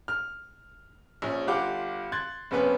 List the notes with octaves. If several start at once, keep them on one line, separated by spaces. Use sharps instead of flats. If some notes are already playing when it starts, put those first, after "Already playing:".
F6
A#1 C#4
G1 F4 G4 F#5 D6
C6 F#6 G#6 A6
F#1 C3 B3 C#4 B4